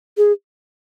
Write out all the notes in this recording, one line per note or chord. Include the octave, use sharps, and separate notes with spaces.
G#4